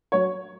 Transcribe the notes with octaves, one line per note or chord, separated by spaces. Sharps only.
F#3 C#5